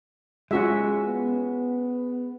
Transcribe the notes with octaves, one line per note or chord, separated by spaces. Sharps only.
G#3 C#4 F4 F#4 E5
B3